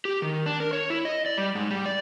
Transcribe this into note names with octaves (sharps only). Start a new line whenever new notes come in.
G4
D#3
D4
A#4
C#5
E4
D#5
D5
G3
G#2
G3
D5